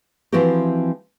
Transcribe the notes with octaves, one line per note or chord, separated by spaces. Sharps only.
E3 F3 C4 E4 F#4 G4